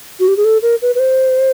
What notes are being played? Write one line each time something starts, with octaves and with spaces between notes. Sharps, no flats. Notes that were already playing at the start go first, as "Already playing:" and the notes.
F#4
G4
G#4
A4
A#4
B4
B4
C5